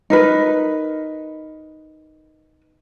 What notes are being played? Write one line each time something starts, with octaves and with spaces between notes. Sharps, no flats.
D#4 A#4 B4